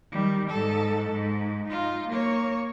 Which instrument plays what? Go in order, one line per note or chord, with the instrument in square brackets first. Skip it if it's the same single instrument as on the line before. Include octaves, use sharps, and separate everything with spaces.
[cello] D#3 G3
G#2 A4
G#2
D#4 F4
A#3 C#5